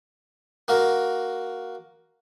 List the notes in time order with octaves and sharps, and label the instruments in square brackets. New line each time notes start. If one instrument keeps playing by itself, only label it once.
[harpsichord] A#3 F#4 A#4